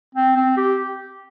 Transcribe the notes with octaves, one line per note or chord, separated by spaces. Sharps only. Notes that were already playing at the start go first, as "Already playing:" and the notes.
C4
C4
G4